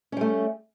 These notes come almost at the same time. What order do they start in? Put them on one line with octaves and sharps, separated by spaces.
C#4 G3 A3